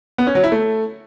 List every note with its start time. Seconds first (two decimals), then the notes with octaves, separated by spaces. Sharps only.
0.18 B3
0.27 C#4
0.35 F#3
0.44 E4
0.52 A3